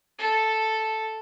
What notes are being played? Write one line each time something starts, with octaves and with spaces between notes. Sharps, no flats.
A4